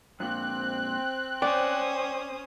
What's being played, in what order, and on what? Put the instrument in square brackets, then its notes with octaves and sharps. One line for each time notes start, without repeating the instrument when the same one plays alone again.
[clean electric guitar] F2 A#2 [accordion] C4 F#6
[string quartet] C#4 C5 D#6 [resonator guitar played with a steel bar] D5 [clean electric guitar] G5